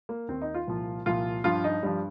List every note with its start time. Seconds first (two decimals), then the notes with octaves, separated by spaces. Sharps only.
0.09 A#3
0.28 D#2 D#3 C4
0.42 D#4
0.54 F4
0.67 C2 A#2 F3
1.06 C2 A#2 F3 F4
1.44 G2 F3 F4
1.64 D#4
1.83 G2 F3 G3